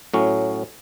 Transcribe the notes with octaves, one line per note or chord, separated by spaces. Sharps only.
A2 F#3 C#4